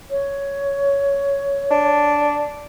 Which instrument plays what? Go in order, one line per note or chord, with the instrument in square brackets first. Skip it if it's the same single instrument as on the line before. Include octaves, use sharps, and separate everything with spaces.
[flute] C#5
[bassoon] D4